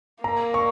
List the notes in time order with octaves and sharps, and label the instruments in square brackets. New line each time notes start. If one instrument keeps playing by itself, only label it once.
[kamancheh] A#3 [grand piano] A#5
[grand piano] C#6